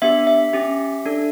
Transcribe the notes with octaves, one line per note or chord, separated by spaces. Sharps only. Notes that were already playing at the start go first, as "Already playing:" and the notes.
B3 D4 G4 E5
E5
C#4 G4
D4 A4